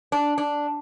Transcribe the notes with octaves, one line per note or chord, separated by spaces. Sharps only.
D4
D4